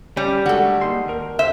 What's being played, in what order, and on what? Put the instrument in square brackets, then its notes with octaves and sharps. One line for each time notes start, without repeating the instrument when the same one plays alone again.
[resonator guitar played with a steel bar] G3 [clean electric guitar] C#4
[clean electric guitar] D3 G#3 A3 [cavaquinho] F#4 A4
[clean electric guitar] A#3 D#4 C6
D#2 A#4
[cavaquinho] C5 [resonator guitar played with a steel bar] E5